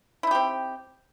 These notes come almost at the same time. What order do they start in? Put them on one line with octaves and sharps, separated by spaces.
E4 D#4 G4 C4